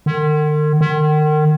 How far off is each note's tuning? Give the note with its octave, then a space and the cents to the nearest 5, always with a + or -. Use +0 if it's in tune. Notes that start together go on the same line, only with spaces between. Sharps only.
D#3 -45
D#3 -35